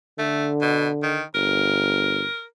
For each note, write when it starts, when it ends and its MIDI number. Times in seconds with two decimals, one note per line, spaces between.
0.18 1.21 50
0.18 0.49 57
0.62 0.89 47
1.03 1.24 51
1.35 2.24 31
1.35 2.44 70